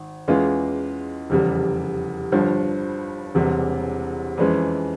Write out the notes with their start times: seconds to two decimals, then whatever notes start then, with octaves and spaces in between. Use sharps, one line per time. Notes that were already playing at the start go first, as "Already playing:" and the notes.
Already playing: G#1
0.28 E2 E3 G#3 C#4 F4
1.30 F1 E2 C#3 G3
2.32 G1 G2 F3
3.35 E1 E2 C3 G3
4.38 F2 E3 G#3 C#4